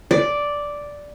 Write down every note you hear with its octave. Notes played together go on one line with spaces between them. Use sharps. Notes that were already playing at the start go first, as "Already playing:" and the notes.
D5